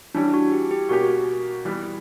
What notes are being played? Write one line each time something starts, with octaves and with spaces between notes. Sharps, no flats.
E3 G3 C#4 D4
F#4
G4
G4
B2 A#3 C#4 F#4 G4
E3 G3 B3